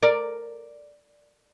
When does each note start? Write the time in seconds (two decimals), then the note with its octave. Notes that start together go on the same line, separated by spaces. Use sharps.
0.03 A#4 D5